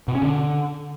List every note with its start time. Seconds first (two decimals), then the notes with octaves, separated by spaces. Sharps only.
0.08 B2
0.15 C#4
0.22 D3